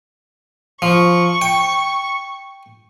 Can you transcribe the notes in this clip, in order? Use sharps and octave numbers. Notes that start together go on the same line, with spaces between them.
F3 C#6
G5